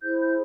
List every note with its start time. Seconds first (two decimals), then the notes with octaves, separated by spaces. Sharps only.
0.03 E4 G#4 C5 G6
0.21 G6